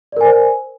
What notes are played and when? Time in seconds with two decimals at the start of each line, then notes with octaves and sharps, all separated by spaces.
0.12 D5
0.17 A#4
0.21 G#5
0.25 C5